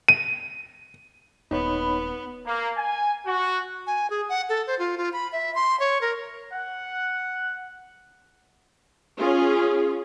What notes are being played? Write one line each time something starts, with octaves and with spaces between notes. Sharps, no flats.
D#7
D#1 B3 D#4 C#5 B5
A#3
G#5
F#4
G#5
G#4
F#5
A4
C5
F4
F4
B5
E5
C6
C#5
A#4
F#5
C#4 F4 G#4